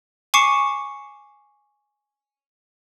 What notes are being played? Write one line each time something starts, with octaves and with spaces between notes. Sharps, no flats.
G#5 C#6 D6 C7 C#7 E7